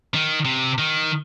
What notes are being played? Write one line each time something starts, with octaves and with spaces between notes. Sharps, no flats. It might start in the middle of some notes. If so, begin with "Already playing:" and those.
D#3
C3
D#3